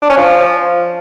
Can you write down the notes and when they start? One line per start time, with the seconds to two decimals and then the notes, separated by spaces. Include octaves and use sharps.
0.02 D4
0.10 C#4
0.17 F3